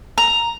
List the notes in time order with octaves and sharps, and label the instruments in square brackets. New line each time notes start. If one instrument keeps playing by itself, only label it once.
[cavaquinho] A#5